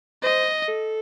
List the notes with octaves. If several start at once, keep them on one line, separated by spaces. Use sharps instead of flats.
C5 D#5
A4